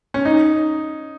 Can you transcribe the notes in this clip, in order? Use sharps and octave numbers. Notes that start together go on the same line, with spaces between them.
C#4
D#4